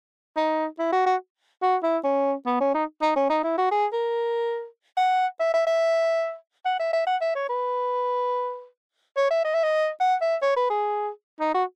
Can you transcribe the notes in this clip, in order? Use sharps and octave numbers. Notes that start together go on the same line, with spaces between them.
D#4
E4
F#4
F#4
F#4
E4
C#4
B3
C#4
D#4
D#4
C#4
D#4
E4
F#4
G#4
A#4
F#5
E5
E5
E5
F#5
E5
E5
F#5
E5
C#5
B4
C#5
E5
D#5
E5
D#5
F#5
E5
C#5
B4
G#4
D#4
F#4